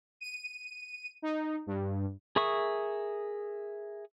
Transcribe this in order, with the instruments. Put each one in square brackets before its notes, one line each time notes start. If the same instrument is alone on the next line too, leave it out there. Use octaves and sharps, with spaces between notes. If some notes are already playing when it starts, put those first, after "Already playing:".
[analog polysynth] D#7
D#4
G2
[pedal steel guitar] G#4 A#4 E5 C#6 D#6